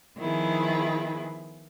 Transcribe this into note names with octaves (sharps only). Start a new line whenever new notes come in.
D#3 F3 B3 E4 G#4